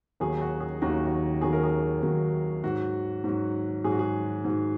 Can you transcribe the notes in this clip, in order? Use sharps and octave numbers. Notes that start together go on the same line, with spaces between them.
D#2 D#3 F#3 G#4
F#4
G#4
D#2 D#3 F#3 F#4
F#4
D#2 D#3 F#3 G#4
A#4
G#4
D#2 D#3 F#3
G#2 F#3 F#4
G#2 F#3
G#2 F#3 G#4
F#4
G#4
G#2 F#3